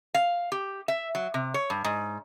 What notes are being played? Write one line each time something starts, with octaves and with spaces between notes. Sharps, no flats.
F5
G4
E5
F#3
C3
C#5
G2
G#2